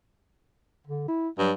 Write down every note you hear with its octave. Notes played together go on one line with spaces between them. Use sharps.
D3
E4
G2 F#3